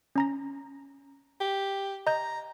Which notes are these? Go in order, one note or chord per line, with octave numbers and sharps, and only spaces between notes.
C#4 A#5 A#6
G4
D#5 A#5 G6